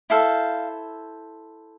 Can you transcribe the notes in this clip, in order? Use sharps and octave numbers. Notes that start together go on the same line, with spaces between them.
E4 A4 C5 F5